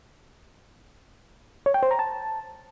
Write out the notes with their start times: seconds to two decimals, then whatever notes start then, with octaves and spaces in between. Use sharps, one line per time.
1.66 C#5
1.74 G5
1.83 C5
1.91 A#5
1.99 A5